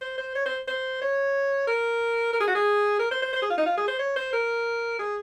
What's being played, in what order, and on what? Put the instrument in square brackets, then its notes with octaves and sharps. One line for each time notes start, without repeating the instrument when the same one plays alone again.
[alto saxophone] C5
C5
C#5
C5
C5
C#5
A#4
A#4
G#4
F#4
G#4
A#4
C5
C5
C5
G#4
F4
D#4
F4
G#4
C5
C#5
C5
A#4
G#4